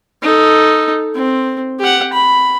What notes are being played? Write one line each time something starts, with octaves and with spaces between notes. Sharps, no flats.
D#4 A4
C4
G4 F#5
B5